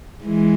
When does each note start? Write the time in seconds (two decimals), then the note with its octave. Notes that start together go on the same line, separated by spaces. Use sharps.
0.25 E3 G#3